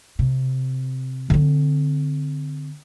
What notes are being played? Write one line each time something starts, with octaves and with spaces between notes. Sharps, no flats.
C3
D3 C4